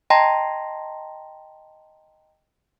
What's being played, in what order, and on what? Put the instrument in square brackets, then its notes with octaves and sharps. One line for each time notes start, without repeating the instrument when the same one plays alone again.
[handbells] D#5 G5 A5 A#5 C6 A#6